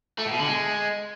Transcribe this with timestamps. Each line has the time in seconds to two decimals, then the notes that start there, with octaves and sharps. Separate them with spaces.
0.18 A3
0.25 A2
0.32 B2
0.39 D3
0.46 G#3